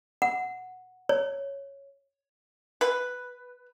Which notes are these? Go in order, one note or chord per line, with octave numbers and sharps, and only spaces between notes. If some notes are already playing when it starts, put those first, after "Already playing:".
F#5
C#5
B4